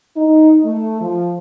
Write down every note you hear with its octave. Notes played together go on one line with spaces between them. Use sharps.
D#4
A3
F3